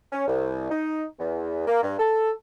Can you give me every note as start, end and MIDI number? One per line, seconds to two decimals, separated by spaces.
0.13 0.25 61
0.27 0.67 36
0.70 1.05 63
1.19 1.63 40
1.67 1.80 58
1.82 1.95 43
1.99 2.31 69